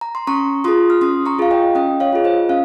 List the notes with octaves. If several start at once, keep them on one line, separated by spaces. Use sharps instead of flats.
A#5
C6
C#4 A#5 C#6
F4 G#4 C6 D#6
F6
C#4 C6 D#6
A#5 C#6
F4 G#4 F5
D#5 G5
C#4 D#5 G5
C#5 F5
F4 G#4
C5 D#5
C#4 F5